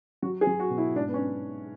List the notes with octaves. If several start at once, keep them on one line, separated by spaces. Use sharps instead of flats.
F#3 F#4
G#4
F#3
F#4
B2
E4
G#2 D4
B3
C#4